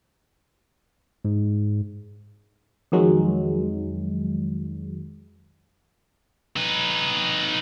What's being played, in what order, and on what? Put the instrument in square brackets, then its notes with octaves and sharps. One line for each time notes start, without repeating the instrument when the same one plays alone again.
[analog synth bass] G#2
[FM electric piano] F2 D#3 F#3 G#3
[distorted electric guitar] D#4 B4